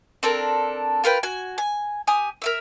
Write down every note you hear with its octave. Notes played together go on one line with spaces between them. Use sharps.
C4 D4 A4 A#4
F4 A#4 B4 G5
F#4 G#5
G#5
G4 G#5 D#6
A#4 E5 E6